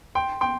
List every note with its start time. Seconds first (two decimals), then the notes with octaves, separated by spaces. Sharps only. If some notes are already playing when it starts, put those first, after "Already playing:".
0.15 G5 C6
0.41 G5 C6